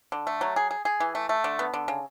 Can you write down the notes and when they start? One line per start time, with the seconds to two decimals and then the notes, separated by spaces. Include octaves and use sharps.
0.12 D3
0.27 A3
0.41 F#3
0.56 G#4
0.71 G#4
0.85 G#4
1.00 E3
1.15 A3
1.29 A3
1.44 D3
1.59 B3
1.74 D3
1.88 C#3